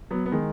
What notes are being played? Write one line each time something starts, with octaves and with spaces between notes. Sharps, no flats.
F#3 B3
B3
D#3 G#3